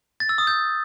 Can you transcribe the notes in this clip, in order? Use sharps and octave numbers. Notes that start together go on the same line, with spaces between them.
A6
E6
D#6
G6